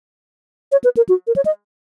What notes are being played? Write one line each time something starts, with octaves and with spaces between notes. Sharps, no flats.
C#5
B4
A#4
F#4
A#4
C#5
D#5